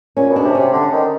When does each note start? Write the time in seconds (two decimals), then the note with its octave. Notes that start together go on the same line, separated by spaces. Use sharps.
0.17 A#2 C#4
0.30 B2
0.36 D4
0.45 C3
0.55 C3 C#4
0.73 D3
0.92 D#3